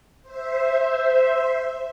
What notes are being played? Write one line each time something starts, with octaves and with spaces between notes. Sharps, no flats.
C5 E5